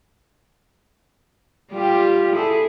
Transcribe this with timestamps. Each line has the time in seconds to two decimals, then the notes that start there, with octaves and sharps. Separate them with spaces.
1.72 G3 F4 G4
2.35 E4 G#4 A4